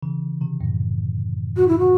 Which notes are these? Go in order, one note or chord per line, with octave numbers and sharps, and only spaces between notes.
C#3 E3
C3 D#3
F#2 A2
F#4
E4
F#4